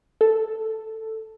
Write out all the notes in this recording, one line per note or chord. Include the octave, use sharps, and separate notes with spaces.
A4